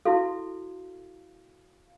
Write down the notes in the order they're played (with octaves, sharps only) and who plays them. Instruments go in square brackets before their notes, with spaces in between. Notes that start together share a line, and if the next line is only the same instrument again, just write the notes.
[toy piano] E4 F#4 A4 [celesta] F5